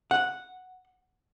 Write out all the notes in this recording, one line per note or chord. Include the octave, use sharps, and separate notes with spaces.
F#5